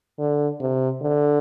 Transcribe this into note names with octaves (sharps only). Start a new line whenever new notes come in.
D3
C3
D3